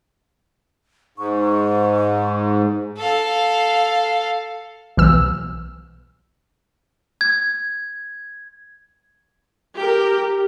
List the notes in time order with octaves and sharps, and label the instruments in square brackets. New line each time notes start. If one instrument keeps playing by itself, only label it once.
[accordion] G#2 [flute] C#6
[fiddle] A4 F5
[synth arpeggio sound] B1 E3 E6
[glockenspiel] G#6
[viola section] G4 A#4